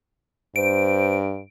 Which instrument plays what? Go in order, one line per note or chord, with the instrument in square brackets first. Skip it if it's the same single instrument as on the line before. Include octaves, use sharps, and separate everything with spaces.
[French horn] G2 [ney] C5 [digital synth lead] D7